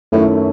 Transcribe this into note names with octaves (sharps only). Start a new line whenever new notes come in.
F#2 A2 D#3 A3 C#4 E4